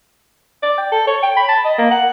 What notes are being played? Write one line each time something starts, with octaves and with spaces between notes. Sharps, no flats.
D5
G5
A4
C#5
G5
B5
A5
D#5
A#3
F#5